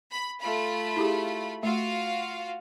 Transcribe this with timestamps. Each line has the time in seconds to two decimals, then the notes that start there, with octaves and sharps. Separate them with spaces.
0.11 B5
0.41 A3 F4 B5
0.97 E4 G4 G#4
1.63 A3 F4 F#4 F5